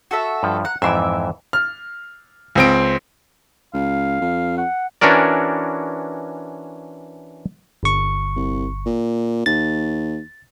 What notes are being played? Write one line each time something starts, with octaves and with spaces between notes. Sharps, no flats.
F#4 A4 E5
G2 F3
F#5 A#5
F2 G#2 E3 E5 C6 D6
F6
C#2 C4 D7
C#2 F5
F2
F#5
E3 C#4 D4 F#4 A#4 D5
G1 C#6
C2
A#2
D#2 A6